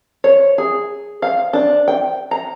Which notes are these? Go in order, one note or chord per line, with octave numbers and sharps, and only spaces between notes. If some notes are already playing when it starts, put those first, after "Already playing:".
C#5
G#4
F5
D4
G5
A#5